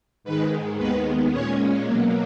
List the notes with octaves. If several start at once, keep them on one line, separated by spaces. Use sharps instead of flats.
G#2 D#3 G#3 B4
D#2 D#3 G#3 B3 B4
A#2 G#3 C#4 C#5
B2 F#3 A#3